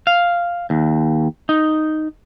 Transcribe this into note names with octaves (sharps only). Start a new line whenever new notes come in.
F5
D#2
D#4